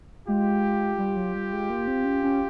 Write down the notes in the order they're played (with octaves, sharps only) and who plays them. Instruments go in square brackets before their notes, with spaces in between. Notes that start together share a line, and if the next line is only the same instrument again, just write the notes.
[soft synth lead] G#3 [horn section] F4 G4
[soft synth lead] G3
F#3
G3
G#3
A#3
C4
C#4
C#4